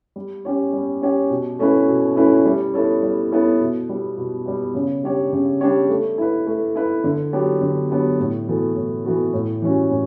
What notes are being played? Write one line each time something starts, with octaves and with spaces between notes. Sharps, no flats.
G3
C#4 G4 C#5
G3
C#4 G4 C#5
B2
A3 C#4 E4 B4
B2
A3 C#4 E4 B4
G3
B3 E4 A4 C#5
G3
B3 E4 A4 C#5
B2
G3 B3
B2
G3 B3
C#3
G3 D4 G4 C#5
C#3
G3 D4 G4 C#5
A3
E4 B4
A3
E4 B4
D3
F#3 B3 D4 G4
D3
F#3 B3 D4 G4
A2
E3 B3 F#4 A4
A2
E3 B3 F#4 A4
A2
E3 G3 C#4 F#4
A2